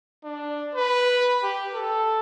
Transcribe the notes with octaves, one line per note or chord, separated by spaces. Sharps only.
D4
B4
G4
A4